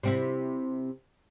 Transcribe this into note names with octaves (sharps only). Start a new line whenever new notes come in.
C3 C4 E4